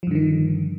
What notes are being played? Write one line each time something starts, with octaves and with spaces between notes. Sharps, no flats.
G2 D3 D#3 F3